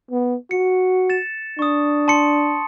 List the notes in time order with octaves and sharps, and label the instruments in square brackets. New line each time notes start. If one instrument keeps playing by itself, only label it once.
[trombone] B3
[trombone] F#4 [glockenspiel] C#7
[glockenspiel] A6 E7
[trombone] D4 [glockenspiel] C#6 D#6
[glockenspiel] A5 C6 C#7